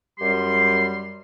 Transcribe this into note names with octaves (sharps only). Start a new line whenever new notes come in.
F#2 G3 G4 C6